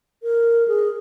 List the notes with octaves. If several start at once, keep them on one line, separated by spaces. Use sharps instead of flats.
A#4
G#4